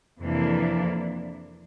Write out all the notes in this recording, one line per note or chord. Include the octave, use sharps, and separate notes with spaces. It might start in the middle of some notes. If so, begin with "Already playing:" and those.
F2 C3 E3 A#3 D4